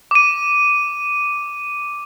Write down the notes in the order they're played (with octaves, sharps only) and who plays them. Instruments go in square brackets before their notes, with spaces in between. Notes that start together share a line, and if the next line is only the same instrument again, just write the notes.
[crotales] D6 D#7